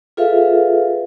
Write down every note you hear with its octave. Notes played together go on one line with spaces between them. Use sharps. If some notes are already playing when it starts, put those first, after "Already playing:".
F4 G#4 A4 B4 E5 F5